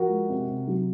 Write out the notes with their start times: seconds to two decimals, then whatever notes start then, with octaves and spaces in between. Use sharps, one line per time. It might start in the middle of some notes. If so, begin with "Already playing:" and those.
Already playing: F3 F#4 A#4
0.09 G#3
0.29 C3
0.48 C3
0.67 F#3